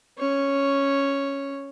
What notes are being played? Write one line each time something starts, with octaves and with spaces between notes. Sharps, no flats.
C#4 C#5